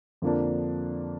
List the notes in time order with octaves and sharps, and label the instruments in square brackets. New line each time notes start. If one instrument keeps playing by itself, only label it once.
[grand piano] F2 D3 F3 A#3 D4